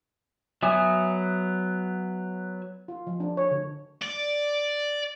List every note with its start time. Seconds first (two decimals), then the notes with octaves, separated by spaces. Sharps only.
0.62 F#3 B3 E5 G#5 D#6
2.88 F4
3.07 F3
3.20 D4
3.37 C#5
3.51 D3
4.02 D5